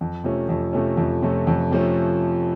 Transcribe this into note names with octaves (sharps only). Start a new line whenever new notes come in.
F2
C3 F3 A3 C#4
F2
C3 F3 A3 C#4
F2
C3 F3 A3 C#4
F2
C3 F3 A3 C#4